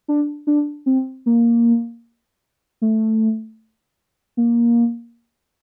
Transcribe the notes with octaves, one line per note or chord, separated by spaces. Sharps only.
D4
D4
C4
A#3
A3
A#3